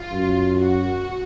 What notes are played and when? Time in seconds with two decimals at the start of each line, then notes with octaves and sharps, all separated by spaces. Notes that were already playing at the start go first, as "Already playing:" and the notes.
Already playing: F4
0.12 F#2
0.56 F#4